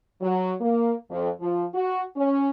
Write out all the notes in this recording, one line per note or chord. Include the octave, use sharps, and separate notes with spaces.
F#3
A#3
F2
F3
F#4
C#4